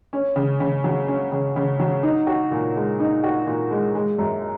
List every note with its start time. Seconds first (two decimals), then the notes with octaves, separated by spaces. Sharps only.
0.13 C#4
0.36 C#3
0.60 C#3
0.84 F#3
1.08 C#4
1.32 C#3
1.56 C#3
1.80 F#3
2.03 D#4
2.27 F#4
2.51 A#2
2.75 G#3
3.00 D#4
3.24 F#4
3.47 A#2
3.71 G#3
3.95 G#3
4.18 F#2